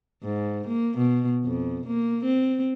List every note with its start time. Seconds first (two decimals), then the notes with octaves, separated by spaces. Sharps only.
0.23 G#2
0.67 A#3
0.98 B2
1.44 F2
1.87 A#3
2.24 C4